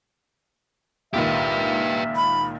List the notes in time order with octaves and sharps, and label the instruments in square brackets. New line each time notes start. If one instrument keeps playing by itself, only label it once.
[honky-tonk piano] C#2 A#2 D#3 [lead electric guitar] G4 B4 [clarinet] E5
[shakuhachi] B5